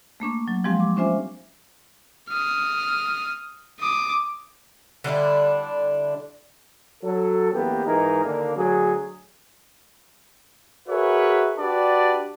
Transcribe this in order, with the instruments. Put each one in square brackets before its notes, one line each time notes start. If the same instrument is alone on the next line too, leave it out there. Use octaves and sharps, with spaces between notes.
[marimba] A3 A#3 D4 C#6
F#3
F3 G3 G#3 C4 G4 F5
D6
C#4 D4 F4 C5 E5 G#5
[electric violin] D#6 F6
D6 D#6
[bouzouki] D3 G3 D4 E4
[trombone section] F#3 A4
A1 E2 A#3 B3 G4
G#2 E3 D#4 G#4 A#4
D#2 D3 A#3
D2 F#3 G#4
[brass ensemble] F#4 G#4 A#4 B4 C#5 E5
D4 F#4 G4 B4 D5 A5